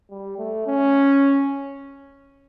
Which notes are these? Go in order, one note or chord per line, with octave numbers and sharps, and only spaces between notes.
G3
A3
C#4